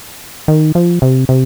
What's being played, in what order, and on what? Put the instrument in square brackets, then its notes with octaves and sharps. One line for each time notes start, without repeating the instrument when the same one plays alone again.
[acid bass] D#3
F3
C3
C3